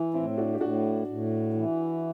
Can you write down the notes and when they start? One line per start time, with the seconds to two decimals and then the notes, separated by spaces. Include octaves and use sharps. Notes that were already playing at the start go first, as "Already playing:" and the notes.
Already playing: E3
0.14 A2 C4 E4
0.38 D4 F#4
0.54 G4
0.60 A2 D4 F#4
1.07 A2
1.54 E3